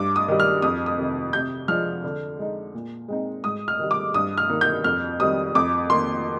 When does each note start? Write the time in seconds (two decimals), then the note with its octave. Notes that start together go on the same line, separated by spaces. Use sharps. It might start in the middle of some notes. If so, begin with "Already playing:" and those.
Already playing: G2 D6
0.16 D#6
0.28 D#3 G3
0.40 F6
0.62 F2 D#6
0.86 D#6
0.97 C3 D#3
1.33 C3 G6
1.68 F3 G#3 D4 F6
2.04 D3
2.39 G#3 D#4
2.74 A#2
3.08 G#3 C4 D#4
3.44 G#2 D#6
3.68 F6
3.79 D#3 G3
3.91 D6
4.14 G2 D#6
4.38 F6
4.49 D#3 A#3 D#4
4.61 G6
4.84 F2 F6
5.20 D#3 G3 C4 D#6
5.55 F2 D6
5.90 D#3 A#3 C6